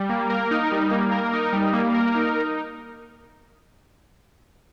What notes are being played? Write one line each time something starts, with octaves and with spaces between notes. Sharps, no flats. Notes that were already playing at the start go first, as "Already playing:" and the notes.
Already playing: G3
A#3
A#4
D#4
G3
A#3
A#4
D#4
G3
A#3
A#4
D#4